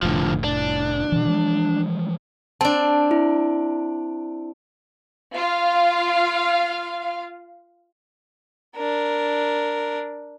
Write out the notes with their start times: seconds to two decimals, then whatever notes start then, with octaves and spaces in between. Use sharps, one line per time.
0.03 F1 A2 D3 F3
0.44 D4
1.12 B2 E3
1.25 E3 F3 G#3
2.61 C4 D4 A5
3.11 E4
5.33 F4 F5
8.76 D4 A#4